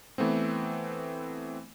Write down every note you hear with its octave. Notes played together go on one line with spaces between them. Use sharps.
E3 A3 B3 C4